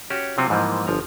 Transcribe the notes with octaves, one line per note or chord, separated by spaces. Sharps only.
C#4 F#4 G4
C3 F#3 C4 F4 F#4
G#2 E3 F3 G3 A#3
G1 F3 A#5